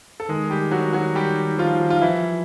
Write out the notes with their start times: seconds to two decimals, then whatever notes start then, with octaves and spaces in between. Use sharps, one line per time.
0.20 A4
0.28 D#3 G#3 G#4
0.50 G3 G4
0.71 F#3 F#4
0.93 F#3 F#4
1.15 G3 G4
1.58 F3 F4
1.90 F4
2.02 E3 F3 E4